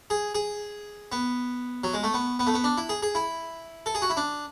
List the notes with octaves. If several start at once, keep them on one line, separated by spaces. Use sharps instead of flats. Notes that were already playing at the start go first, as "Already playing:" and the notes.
G#4
G#4
B3
F#3
G#3
A3
B3
B3
A3
B3
D4
E4
G#4
G#4
E4
A4
G#4
F#4
E4
D4